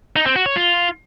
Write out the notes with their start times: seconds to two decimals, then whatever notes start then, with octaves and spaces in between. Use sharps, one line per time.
0.16 D#4
0.26 C4
0.36 F#4
0.46 C#5
0.56 F4